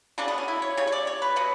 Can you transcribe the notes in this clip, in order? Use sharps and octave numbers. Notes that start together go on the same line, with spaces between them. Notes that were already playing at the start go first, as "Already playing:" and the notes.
C#3 F#3 A3 D4
B3
C#4
E4
C#5
C#3 G3 C#5
C#5
D5
C#5
B4
B2 F#3 B3